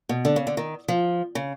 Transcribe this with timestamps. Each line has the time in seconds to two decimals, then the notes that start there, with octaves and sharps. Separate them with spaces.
0.09 B2
0.25 D3
0.36 C#3
0.47 D3
0.57 D#3
0.88 F3
1.35 C#3